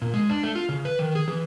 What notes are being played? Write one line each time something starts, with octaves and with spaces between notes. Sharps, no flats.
A#2
G#3
D4
A3
F4
C#3
B4
D#3
G#4
E3